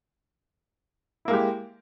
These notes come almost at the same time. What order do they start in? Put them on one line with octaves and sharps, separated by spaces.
E4 A#3 G#3 G4